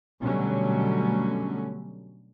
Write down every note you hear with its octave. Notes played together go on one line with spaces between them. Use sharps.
B2 D3 F#3 G3 A3 C#4